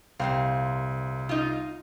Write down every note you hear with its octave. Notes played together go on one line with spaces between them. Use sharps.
C2 A#2 C#3 C4 F5
D#4 F4